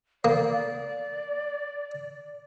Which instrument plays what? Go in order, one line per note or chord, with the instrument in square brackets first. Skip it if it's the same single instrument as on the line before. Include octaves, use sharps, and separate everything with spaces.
[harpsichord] A#3 [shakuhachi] D5